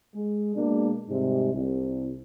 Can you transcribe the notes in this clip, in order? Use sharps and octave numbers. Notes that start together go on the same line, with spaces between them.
G#3
B2 G#3 A#3 D4
G#2 C3 G3 G#3
C2